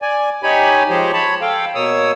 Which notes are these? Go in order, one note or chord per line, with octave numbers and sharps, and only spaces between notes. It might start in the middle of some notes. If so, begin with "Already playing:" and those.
D5 G#5
D#4 G4 C#5 G#5 B5
F3 G#3 G4 C5 C#5 D#5
C#5 A5 B5
A4 F5 G5
B2 A#3 C#5 D#6 E6